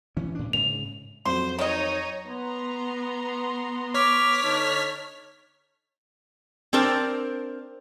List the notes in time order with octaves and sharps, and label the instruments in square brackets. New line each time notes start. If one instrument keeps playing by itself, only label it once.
[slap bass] E3 C#4
A2 D4
[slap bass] G#2 C#3 [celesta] F7
[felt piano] F2 F#3 [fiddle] C5 [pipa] C6
[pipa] D#3 D#5 [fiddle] D#4 [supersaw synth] C#5 A#5
[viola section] B3 A#5 C6
[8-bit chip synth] C#5 F6 B6 [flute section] D6
[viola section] D3 D#4 A5
[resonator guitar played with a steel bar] C4 D4 A#4 C5